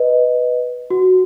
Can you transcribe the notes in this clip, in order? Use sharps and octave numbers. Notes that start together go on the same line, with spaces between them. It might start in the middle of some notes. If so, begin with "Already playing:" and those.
Already playing: B4 D#5
F#4